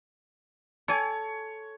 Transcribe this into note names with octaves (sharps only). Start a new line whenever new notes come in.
A4 C#5 G#5